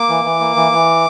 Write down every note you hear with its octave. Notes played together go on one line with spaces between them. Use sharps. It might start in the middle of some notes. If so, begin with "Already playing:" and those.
Already playing: A#3 D6
E3
E3
A#3
E3
E3